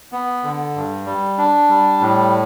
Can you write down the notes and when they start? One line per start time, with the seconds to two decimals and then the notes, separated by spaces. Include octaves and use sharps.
0.12 B3
0.44 D3
0.76 G2
1.06 G3
1.38 D4
1.69 G3
2.00 A2